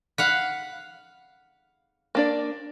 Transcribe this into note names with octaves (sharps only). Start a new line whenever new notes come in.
F5 F#5 B5
A#3 D4 D5